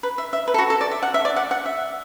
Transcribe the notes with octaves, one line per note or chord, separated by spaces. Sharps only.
B4
E5
E5
B4
A4
F#4
A4
D5
E5
F#5
E5
D5
F#5
F#5
E5